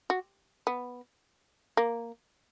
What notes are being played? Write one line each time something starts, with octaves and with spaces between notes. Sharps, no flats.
F#4
B3
A#3